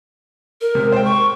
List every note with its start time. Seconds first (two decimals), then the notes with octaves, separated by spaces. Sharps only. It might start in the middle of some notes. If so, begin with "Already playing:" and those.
0.61 A#4
0.75 G#2 C3
0.92 C5 G5
1.04 C#6